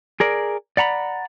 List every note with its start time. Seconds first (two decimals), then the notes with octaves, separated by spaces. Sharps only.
0.20 G#4 A#4 D5
0.77 D5 F#5 A#5 B5